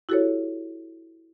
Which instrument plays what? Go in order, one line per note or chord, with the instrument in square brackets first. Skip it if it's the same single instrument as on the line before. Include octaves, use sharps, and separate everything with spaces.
[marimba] E4 F#4 G4 A4 C5 C#5